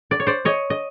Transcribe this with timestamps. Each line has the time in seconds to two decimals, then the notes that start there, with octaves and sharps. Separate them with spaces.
0.11 D5
0.20 C#5
0.27 C5 D5
0.45 C#5 D#5
0.70 D#5